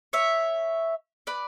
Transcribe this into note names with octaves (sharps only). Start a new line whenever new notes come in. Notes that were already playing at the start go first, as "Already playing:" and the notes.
C#5 E5
B4 D5